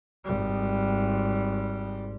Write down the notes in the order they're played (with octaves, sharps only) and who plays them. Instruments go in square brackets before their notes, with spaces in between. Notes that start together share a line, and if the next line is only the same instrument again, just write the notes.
[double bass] G#1 G3